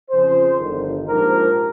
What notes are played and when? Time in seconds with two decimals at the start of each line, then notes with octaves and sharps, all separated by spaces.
0.11 F2 C#3 F3 G#4 C5
0.59 G1 F2 D#3
1.07 A#1 G#2 F3 G4 A#4